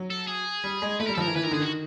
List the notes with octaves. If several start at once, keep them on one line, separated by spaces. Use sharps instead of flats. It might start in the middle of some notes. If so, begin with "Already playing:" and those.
Already playing: F#3
A4
G#4
G3
G#3
A3 B4
G3 A#4
A4
F3
E3 A#4
E3 B4
D#3 A#4
D3 G#4
D#3 F#4